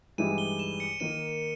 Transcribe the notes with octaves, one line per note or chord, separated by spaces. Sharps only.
G2 E3 G#3 D#4 G4 D#7
G7
E7
C#7
D#3 A#3 D#4 A#4 D#7